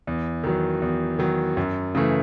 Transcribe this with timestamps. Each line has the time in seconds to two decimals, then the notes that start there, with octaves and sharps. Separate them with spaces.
0.07 E2
0.44 D#3 F#3
0.82 E2
1.19 D#3 F#3
1.57 F#2
1.95 C#3 E3 A3